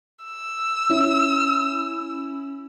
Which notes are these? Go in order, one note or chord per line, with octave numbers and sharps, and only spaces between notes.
E6
C#4 E4